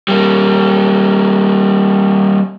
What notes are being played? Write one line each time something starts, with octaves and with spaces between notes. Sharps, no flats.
G3 A#3